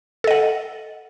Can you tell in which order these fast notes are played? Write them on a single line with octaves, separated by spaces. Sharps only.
A4 D#5 F#5